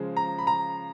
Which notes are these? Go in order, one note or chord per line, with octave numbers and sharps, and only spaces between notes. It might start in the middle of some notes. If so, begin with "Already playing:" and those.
Already playing: C#3 F3 G#3
A#5
B5
A#5